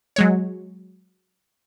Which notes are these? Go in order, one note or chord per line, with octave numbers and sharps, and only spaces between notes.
F#3 G#3 C#5